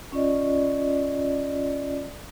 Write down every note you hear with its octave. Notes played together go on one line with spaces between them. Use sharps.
C#4 F4 D5 D#5